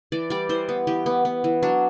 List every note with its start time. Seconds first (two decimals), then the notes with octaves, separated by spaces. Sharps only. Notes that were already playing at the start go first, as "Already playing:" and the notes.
0.12 E3 D5
0.30 G3 D5
0.49 E3 C5
0.69 B3
0.87 E3 G4
1.06 B3
1.25 B3
1.44 E3
1.63 F#3 D4